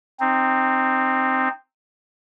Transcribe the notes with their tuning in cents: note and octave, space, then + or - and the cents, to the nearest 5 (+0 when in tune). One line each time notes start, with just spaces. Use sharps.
C4 +0 D#4 -20